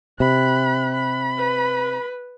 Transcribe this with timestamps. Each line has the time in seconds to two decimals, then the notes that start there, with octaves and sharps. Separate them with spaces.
0.20 C3 B5 F#6
0.94 B5
1.38 B4